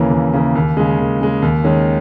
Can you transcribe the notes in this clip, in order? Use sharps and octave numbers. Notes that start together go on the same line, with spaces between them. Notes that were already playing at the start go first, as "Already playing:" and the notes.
Already playing: D#2 C#3 E3 A#3 C#4
D#2
C#3 E3 A#3 C#4
D#2
C#3 G#3
D#2
C#3 G#3
D#2
D#3 G#3 C#4